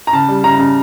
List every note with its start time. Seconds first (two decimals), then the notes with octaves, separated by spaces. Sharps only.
0.07 A#5
0.13 C#3 A5
0.29 G3
0.44 C#3 A#5
0.59 C#3